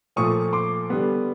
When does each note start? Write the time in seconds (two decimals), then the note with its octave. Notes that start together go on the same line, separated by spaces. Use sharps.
0.16 A#2 F3 A3 C#6 D#6
0.53 C6 D6
0.90 D3 G3 B3